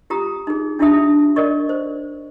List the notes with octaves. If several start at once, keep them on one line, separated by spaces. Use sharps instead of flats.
F4 G4 A#5 D#6
D#4 G#4
D4 E4 F4 G4 E5 D#6
A#4 D5 D#5 C#6
C5